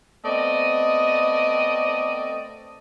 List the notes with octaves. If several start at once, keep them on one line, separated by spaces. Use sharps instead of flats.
A3 B3 C4 D5 D#5